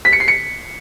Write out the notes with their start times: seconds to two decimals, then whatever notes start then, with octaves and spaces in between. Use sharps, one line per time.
0.05 B6
0.13 C#7
0.20 C7
0.28 C#7